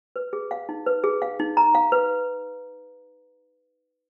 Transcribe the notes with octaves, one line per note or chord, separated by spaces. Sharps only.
B4
G#4
F5
D#4
B4
G#4
F5
D#4
A#5
F5
B4